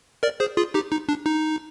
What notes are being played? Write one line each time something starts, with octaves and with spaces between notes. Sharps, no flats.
A#4 D5
G#4 C5
F4 G#4
D#4 G4
D#4
D4
D#4